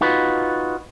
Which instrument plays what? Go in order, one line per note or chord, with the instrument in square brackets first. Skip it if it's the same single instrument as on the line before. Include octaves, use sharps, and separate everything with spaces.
[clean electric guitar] D#4 F4 F#4 B4